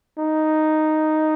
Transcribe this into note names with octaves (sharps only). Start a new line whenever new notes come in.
D#4